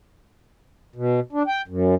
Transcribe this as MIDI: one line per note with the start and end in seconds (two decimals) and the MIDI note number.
0.96 1.20 47
1.32 1.43 62
1.47 1.62 79
1.68 1.95 42